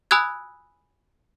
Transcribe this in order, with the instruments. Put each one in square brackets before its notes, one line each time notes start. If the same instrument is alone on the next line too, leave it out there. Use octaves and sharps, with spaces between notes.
[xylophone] G#5 B5 D#6 E6 F#6 G#6